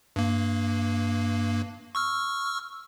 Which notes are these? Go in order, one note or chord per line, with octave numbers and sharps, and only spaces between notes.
G2 A#3
C#6 E6 F6